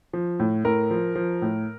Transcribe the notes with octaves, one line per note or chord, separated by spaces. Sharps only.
F3
A2
A2 A#4
F3
F3
A2